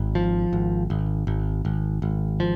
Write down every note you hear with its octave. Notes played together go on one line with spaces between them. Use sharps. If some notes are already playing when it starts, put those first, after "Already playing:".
Already playing: G#1
F3
G#1
G#1
G#1
G#1
G#1
F3